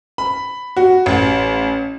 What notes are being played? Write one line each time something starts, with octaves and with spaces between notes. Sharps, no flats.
B5
F#4
A1